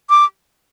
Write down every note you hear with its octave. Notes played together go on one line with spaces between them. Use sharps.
D6